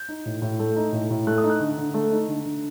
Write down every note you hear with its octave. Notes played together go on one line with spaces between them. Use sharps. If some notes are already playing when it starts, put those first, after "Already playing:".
Already playing: G6
D#4
A2
A2
A3
D#4
A2
A2
A3 F#6
D#6
D#4
F#6
D3
D3
A3
D#4
D3
D3